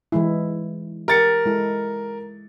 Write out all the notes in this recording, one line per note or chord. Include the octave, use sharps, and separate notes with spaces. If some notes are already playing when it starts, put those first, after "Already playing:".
E3 G#3 E4
G4 A#4 A6 C#7
G#3 E4 A4